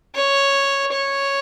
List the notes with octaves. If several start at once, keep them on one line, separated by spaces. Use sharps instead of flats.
C#5
C#5